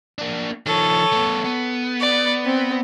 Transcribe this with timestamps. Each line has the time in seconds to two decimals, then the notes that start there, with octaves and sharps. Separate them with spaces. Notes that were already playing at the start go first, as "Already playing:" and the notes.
0.18 A#3 D4
0.66 D#3 F3 A4 C#5
1.13 A3 B3
1.44 B3
2.00 D5
2.46 C4